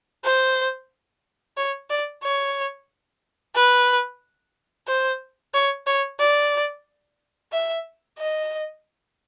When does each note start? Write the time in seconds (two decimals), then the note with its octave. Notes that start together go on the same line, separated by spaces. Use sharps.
0.24 C5
1.57 C#5
1.90 D5
2.23 C#5
3.55 B4
4.87 C5
5.54 C#5
5.87 C#5
6.20 D5
7.52 E5
8.18 D#5